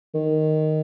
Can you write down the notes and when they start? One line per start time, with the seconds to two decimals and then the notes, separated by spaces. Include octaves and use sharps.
0.14 D#3